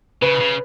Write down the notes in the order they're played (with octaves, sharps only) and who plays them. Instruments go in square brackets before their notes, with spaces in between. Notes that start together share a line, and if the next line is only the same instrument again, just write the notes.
[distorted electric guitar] C#3 [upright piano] B4
[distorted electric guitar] C#3